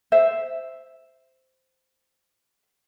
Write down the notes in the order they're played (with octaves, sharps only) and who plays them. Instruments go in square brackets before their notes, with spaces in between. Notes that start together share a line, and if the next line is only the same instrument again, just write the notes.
[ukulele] C5 E5